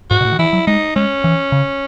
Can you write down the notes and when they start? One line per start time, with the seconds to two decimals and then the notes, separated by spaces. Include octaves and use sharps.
0.10 G#2 F#4
0.21 B2
0.25 A2
0.32 D#3
0.39 E3 E4
0.53 F#3
0.67 G#3 D#4
0.96 G#3 C#4
1.24 E3
1.52 C#3